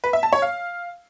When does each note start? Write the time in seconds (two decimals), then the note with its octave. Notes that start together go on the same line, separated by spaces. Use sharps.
0.04 B4
0.13 E5
0.23 A5
0.33 C#5
0.42 F5